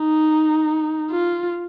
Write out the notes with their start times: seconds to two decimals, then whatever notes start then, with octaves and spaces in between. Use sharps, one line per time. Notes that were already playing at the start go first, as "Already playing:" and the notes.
Already playing: D#4
1.11 F4